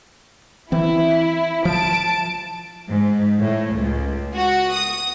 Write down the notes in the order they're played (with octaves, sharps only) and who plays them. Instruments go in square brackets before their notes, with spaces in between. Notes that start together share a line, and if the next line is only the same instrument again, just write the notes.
[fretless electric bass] E3 C4 [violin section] E4
[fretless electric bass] F3 [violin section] A5 D7
[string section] G#2
A2
C#2
F#4
D#6